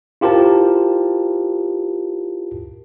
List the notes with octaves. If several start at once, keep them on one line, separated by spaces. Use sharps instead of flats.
E4 F4 G4 A#4 C5 A5